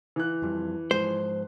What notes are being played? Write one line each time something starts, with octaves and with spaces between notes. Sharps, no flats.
E3 F#6
F2 F3 G3
G#2 F3 G#3 C5